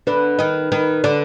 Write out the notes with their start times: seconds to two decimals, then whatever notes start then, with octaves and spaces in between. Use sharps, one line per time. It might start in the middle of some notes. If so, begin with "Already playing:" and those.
0.07 D3 D4 B4
0.39 D#3 D#4
0.72 D#3 D#4 B4
1.04 D3 D4